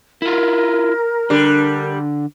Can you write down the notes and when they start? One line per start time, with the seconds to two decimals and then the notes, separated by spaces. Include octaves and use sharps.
0.22 E4 F4 A#4
1.30 D3 G3 D4